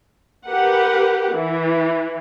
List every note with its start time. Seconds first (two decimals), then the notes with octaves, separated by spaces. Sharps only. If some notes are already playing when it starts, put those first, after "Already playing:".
0.46 G4 A#4 B4 F#5
1.35 E3